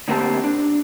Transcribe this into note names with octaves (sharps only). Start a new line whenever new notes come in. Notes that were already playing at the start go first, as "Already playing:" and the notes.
A2 D3 A#3 C4 G4 A5
D4